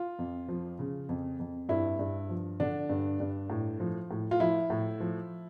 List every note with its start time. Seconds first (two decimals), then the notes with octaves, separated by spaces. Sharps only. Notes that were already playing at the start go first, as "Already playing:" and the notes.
Already playing: F4
0.19 F2
0.48 F3
0.79 C#3
1.09 F2
1.39 F2
1.69 G2 E4
1.99 G2
2.29 F3
2.60 D3 D4
2.89 G2
3.20 G2
3.50 A2
3.80 F3
4.11 A2
4.31 F4
4.40 F3 E4
4.70 A2
5.00 F3